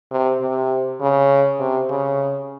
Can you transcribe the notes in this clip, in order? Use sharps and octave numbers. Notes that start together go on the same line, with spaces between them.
C3
C3
C#3
C3
C#3